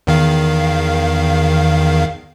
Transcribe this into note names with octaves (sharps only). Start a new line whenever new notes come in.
E2 D#3 F5